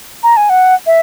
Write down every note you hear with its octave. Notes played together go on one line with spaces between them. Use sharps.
A#5
G#5
F#5
E5